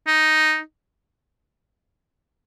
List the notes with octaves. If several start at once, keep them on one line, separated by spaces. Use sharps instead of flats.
D#4